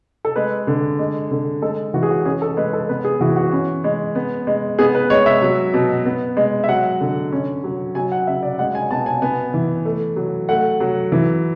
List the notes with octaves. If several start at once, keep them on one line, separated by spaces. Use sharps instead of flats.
A4
G#3 B4
D3
G#3
D3
G#3 A4
E3 F#4
G#4
F#4
C#4 G#4
A4
G#3 B4
A4
B3 B4
G#4
E3 F#4
F#4
C#4
G#3
B3
G#3
B3 G#4
B4
G#3 C#5
E5
F#3
B2
B3
G#3
E5
F#3 F#5
D3
C#4
F#3
F#3 G#5
F#5
C#3 E5
D5
G#3 F#5
G#5
B2 A5
G#5
B3 G#5
E3
A3
F#3
A3 F#5
F#3
E3